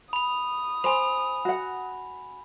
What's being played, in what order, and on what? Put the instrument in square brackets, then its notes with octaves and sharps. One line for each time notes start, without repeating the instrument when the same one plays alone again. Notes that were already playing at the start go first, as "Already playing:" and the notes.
[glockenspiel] B5 F7 [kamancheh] D#6
[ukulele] C5 [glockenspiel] G#5 B5 F7
[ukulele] F#4 F#5